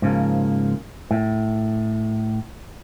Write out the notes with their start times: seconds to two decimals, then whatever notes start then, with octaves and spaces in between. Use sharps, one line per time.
0.02 G#2 C#3 F3 A#3
1.11 A2